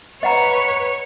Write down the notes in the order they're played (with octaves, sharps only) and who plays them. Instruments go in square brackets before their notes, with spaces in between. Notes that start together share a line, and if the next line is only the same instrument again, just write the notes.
[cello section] B4 [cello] C#5 [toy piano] D#5 F#5 A#5